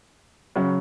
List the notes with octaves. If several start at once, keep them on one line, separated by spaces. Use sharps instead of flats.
C#3 F#3